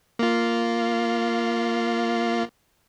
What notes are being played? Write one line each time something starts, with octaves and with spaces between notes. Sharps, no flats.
A#3 F4